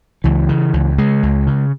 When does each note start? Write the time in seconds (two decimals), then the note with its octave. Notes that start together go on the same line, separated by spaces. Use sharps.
0.24 C#2 E3
0.49 C#3
0.73 C#2
0.98 C#3 G#3
1.23 C#2
1.47 C#3